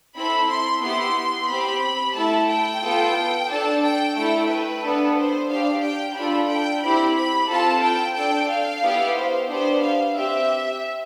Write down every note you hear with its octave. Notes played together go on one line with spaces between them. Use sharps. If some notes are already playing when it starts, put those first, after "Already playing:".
C4 E4 A4 B5
C6
B3 E4 G4 C6
C4 G4 B5
A3 E4 A4 A5
G5
B3 F4 A4
D4 A4 A5
G5
A3 E4 A4 G5
B4
B3 D4 A4
C5
D4 G4 F5
G5
D4 F4 A4 B5
G5
C4 E4 G4 B5
B5
C4 F4 A4 A5
G5
D4 A4 G5
F5
B3 E4 G4
C5
B3 D4 G4 C5
F5
C4 G4 E5